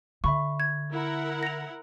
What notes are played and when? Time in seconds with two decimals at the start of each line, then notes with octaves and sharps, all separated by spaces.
0.24 D3 E5 B5 C#6
0.60 G#6
0.92 E4 A#4 F#5
1.43 A#6 F7